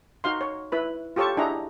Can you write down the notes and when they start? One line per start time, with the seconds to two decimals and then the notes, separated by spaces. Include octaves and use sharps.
0.24 D#4 F#4 F5 C6
0.41 C#5
0.72 E4 B4 B5
1.16 F4 G4 A4 C#5 A5 C#6
1.37 D4 E4 G#4 D#5 F#5 A#5